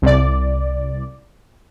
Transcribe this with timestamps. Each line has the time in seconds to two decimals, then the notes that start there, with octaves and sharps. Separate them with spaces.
0.02 C2 D5